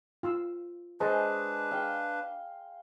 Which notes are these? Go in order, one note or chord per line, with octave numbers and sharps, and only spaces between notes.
F4 C6 E6
G#3 D4 B4 C5 A5
F5 G5